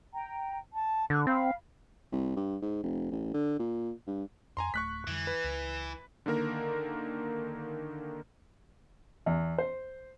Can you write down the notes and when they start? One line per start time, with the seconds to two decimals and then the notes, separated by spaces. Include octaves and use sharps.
0.13 G5 A#5
0.74 A5
1.10 D3 C#6 F#6
1.27 C4 F5 B5
2.12 C2
2.36 G2
2.62 G#2
2.83 F1
3.11 A1
3.34 D3
3.59 A#2
4.07 G2
4.57 F2 G#5 A#5 C6
4.74 D1 A3 C#6 F#6 B6
5.07 F2 D3 E3 G3
5.27 B4
5.44 C#2
6.26 D3 D#3 A#3 A#4 A#5
9.26 E2
9.58 C5